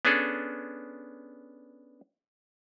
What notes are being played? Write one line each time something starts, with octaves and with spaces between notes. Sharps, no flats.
B3 C#4 D4 G#4 A4